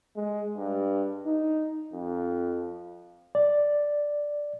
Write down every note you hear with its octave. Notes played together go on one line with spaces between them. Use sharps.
G#3
G2
D#4
F2
D5